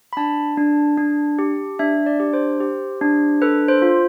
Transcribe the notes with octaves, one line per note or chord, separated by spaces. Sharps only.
B5
D4 A5
D4
D4
G4
D4 E5
D5
G4
C5
G4
D4
A4 B4
C5
F4